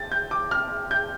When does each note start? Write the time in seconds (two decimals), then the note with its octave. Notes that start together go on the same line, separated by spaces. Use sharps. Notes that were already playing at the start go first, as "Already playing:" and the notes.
Already playing: A6
0.12 G6
0.31 D6
0.51 F6
0.91 G6